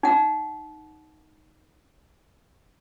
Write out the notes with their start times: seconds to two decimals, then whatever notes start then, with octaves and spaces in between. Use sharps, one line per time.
0.03 D#4 F#5